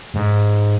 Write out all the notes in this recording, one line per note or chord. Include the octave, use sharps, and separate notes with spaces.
G#2